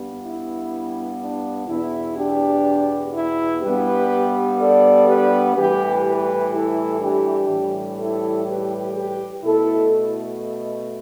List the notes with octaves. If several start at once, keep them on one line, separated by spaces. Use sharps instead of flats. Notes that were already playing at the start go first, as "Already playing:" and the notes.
Already playing: G2 G3 B3
E4
D4
E2 B2 B3 E4
D4 G4
E4
G2 G3 B3 G4 B4
A4 D5
G4 B4
A2 E3 G3 G4 B4
G4 B4
E4 A4
D4 G4
A2 E3 G3
E4 A4
G4 B4
G4 B4
B2 A3 E4 A4